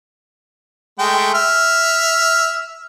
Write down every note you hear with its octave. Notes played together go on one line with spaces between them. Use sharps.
G#3 A3 G5
E5 F6